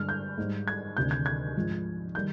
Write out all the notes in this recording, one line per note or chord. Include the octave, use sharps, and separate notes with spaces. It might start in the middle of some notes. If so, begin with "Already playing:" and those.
Already playing: G2 D3 G#3 F6
G6
G#2 G3
G#6
D2 C3 D#3 G6
G#6
G#6
G#2 F3 G#3
D#3 G3 G6